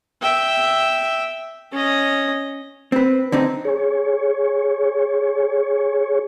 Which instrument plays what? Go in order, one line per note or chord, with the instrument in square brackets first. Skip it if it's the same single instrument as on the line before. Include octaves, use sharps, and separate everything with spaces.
[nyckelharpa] E5 G5
C#4 D#5
[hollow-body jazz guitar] C4 B4
D3 C4 D#4
[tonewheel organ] G#4 C#5